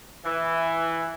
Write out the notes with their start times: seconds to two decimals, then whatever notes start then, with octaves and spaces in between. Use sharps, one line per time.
0.25 E3